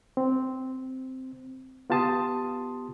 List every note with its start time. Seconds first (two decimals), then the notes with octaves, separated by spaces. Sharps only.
0.17 C4
1.90 B3 F4 G4 A5 C6 D#6